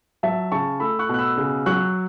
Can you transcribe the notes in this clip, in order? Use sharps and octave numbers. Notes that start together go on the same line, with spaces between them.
F#3 E5 A5
C#3 A5 C#6
A3 B5 E6
C#6 F#6
B2 F#6
B5 E6
C#3
F#3 C#6 F#6